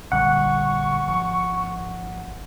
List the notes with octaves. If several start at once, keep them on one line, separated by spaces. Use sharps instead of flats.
A#1 D3 G3 F#5 C#6
G#1 F3